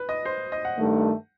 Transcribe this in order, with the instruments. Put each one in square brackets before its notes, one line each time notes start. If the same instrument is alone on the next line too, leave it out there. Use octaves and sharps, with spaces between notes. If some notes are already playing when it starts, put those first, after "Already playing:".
Already playing: [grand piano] B4
D#5
C5
D#5
F#5
[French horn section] G2 D#3 A3